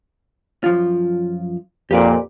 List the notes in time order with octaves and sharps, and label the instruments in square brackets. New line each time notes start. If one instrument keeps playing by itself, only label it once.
[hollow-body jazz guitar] F#2 F3 F4
[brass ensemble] F2 A#2 [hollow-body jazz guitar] G4 B4 D5